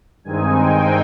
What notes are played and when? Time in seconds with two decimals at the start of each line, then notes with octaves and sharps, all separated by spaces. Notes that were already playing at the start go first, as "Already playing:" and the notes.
0.24 G2 D#3 G#3 C4 D#4 G#5
0.58 G5